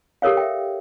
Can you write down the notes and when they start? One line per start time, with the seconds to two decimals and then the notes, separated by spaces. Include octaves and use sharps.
0.22 G4 A4 A#4 C#5 F5
0.37 E5 G5